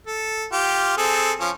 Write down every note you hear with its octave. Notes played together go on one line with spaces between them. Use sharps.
A4
F4 G4
C4 G#4 A4
F3 C#4